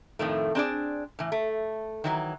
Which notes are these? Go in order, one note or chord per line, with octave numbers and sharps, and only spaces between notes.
F2 A2 D#3 A3
C4 D4 G#4 D5
A2 E3
A3
D#3 E3 F#3